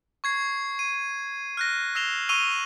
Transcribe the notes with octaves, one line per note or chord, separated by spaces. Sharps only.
C#6 G#6 C7
D#7
F6 F#6 A#6
E6 A#6 C7 E7 F7 G7
C#6 E6 F6 D#7 F7 G7